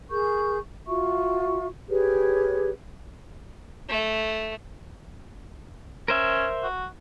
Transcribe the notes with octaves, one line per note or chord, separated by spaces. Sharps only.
G#4 A#4 C#6 G6
F4 F#4 E5 C#6
G4 G#4 B4 C#5
A3
C#4 A#4 C5 E5
F#4